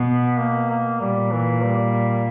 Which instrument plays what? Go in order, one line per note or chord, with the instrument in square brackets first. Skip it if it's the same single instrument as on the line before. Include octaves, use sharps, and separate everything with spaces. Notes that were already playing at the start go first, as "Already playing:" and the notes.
Already playing: [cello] B2 [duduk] B3
[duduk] A#3
A#3
[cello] A#2 [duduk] G3
[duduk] E3
G3